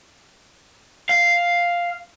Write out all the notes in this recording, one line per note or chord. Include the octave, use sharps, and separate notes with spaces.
F5